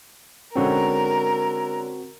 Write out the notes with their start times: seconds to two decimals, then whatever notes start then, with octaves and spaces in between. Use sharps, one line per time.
0.56 D3 G#3 C4 C#4 F#4 A#4